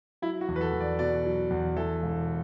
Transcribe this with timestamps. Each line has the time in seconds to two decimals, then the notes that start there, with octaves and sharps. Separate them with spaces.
0.22 F#3 E4
0.41 F#4
0.48 E2
0.56 B4
0.61 A4
0.73 E2
0.80 D5
0.99 B2 D5
1.25 F#3
1.50 E2
1.76 E3 A4
2.02 E1